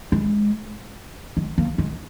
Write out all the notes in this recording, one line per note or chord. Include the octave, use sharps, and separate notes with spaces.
G#3
G#3
A#3
G#3